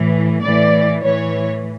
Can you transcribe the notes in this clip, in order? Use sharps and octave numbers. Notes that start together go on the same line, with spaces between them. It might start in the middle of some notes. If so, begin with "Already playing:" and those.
Already playing: A2 E3
A2 E3 D5
A2 E3 C#5